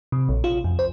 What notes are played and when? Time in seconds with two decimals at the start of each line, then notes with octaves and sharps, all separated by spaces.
0.12 C3
0.29 A#1
0.44 F4
0.64 F2
0.79 C5